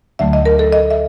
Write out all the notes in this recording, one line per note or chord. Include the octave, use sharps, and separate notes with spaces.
D2 D3 F#3 A3 E5
D#5
A#4
A4
D#5
E5